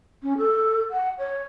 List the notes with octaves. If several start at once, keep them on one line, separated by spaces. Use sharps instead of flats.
C#4
A4
F#5
C#5